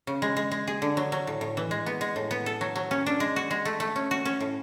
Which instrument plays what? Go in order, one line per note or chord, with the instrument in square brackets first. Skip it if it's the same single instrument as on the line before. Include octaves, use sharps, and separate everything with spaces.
[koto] C#3
G#3
G#3
G#3
G#4
D3
F#3
F#3
A2
A2
E3
G#3
B3
G#3
A2
B3
A4
F#3
F#3
C#4
D4
G#3
F#4
G#3
A3
A3
C#4
F#4
C#4
A2